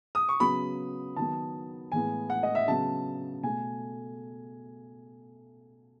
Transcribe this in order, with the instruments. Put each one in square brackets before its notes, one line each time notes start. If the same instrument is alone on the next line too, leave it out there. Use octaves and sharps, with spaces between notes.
[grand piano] D#6
C#6
C#3 F#3 B3 B5
D#3 F#3 B3 A5
A2 E3 G#3 B3 G#5
F#5
D#5
E5
C#3 F#3 B3 A5
B2 A3 G#5